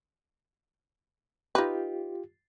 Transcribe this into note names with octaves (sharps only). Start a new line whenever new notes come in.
D#4 F4 G4 B4